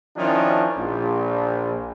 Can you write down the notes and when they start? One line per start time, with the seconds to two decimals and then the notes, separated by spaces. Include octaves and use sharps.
0.16 D#3 F3 C#4 D4 E4
0.77 A#1